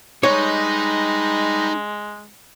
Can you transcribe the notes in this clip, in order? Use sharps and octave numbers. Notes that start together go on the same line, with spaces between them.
G3 G#3 D#4 B4 C#5 D#5 A#6